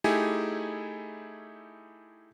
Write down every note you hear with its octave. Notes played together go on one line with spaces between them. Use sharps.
A3 D#4 E4 G4 G#4 G#5